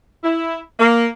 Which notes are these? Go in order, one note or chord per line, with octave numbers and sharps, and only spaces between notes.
E4
A#3